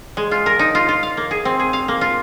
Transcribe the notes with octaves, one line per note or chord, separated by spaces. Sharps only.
G#3
F4
A#4
D#4
F4
F4
F5
A#3
G#4
C4
G#4
F5
A#3
F4